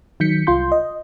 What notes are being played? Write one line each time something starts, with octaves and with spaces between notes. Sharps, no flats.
D#3 F#3 G6 B6 C#7
C2 F4 C6 G6
D#5